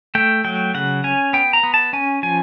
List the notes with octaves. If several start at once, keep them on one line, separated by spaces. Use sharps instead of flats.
A3 G5
F#3 G5
C#3 F#5
C#4 G#5
B3 G5
A#5
B3
A5
C#4 G#5
F3 G#5